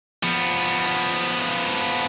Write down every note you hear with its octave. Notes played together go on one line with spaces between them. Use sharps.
F3 B3